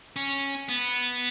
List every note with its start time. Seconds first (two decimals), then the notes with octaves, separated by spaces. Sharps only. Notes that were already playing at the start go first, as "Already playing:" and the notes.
0.16 C#4
0.69 B3